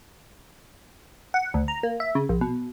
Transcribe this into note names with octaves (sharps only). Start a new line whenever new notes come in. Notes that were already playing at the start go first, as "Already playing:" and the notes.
F#5
D2
A#5
A#3
E5
C#3
A#1
B2